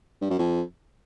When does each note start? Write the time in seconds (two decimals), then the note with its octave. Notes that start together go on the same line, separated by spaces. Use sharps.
0.21 G2
0.30 F#2
0.39 F2